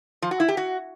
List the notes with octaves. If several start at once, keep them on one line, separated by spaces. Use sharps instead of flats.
F3
F#4
E4
G4
F#4